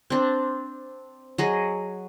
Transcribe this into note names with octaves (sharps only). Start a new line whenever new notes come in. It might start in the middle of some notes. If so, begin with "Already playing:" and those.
C4 D4
F#3 G#4 D#5